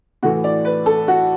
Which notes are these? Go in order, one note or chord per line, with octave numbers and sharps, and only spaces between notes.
A2 E3 A3 F#4
D5
B4
A4
F#4